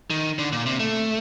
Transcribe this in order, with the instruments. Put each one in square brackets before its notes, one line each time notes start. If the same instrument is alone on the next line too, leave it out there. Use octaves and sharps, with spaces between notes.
[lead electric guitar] D#3
D3
A#2
C3
A3